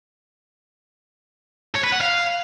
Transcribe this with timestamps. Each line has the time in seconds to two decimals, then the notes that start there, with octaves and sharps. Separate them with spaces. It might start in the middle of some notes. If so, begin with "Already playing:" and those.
1.75 C#5
1.84 B4
1.92 F#5
2.01 F5